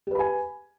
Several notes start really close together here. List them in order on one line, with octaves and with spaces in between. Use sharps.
G4 B4 B5 G#5